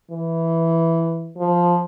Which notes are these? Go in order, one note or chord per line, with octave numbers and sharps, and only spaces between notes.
E3
F3